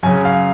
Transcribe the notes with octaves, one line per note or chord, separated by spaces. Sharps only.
F#2 C#3 G#5
F5